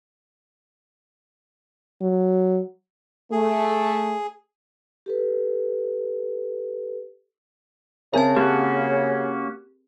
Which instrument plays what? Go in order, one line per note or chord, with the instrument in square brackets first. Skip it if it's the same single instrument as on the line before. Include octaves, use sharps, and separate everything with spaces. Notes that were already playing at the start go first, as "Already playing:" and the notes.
[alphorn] F#3
[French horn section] A3 [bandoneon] G#4
[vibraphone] G4 A4 B4
[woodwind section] C#3 [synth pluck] C4 G#4 A#4 [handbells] E5 A5
[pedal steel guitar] A#3 C#4 F#4 [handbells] G4